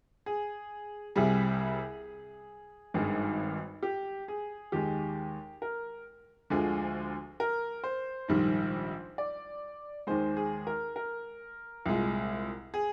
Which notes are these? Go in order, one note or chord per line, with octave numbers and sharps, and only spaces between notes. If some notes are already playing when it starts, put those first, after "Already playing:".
G#4
C2 C3 G3 G#4
G#1 G2 D#3 G#3
G4
G#4
D#2 D#3 G#3 G4
A#4
D2 D3 F3 G#3
A#4
C5
A#1 G#2 D#3 G3
D5
D#2 D#3 G#3 C5
G#4
A#4
A#4
C2 A#2 G#3
G#4